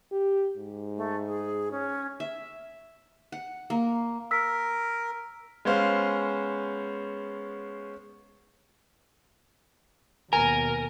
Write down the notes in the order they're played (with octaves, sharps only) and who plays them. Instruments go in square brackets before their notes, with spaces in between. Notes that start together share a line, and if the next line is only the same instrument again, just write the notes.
[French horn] G4
G#2
[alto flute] A3
G#4
C#4
[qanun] E5
F#5
A#3
[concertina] A#4 [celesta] E6 B6
[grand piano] G#3 B3 C#4 C5 F5
[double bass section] D#2 B2 [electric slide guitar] A#4 [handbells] G#5